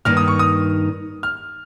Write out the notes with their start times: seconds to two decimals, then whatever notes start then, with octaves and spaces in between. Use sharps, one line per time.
0.05 G2 D#3 A#3 F6
0.17 D#6
0.28 C#6
0.39 D#6
1.23 F6